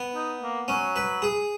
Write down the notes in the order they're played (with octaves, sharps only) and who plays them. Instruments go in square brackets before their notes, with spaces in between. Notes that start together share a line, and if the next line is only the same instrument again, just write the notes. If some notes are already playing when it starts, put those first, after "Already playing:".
Already playing: [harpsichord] B3
[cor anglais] D#4
A#3
[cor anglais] F#3 [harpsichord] C#4
[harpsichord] B4
G#4